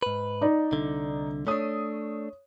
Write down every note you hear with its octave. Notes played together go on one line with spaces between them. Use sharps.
G#2 B4
D#4 D5
C2 D3
A3 D4 C#5 D#6